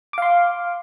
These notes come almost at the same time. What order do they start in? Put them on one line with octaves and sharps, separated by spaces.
D6 F5 C6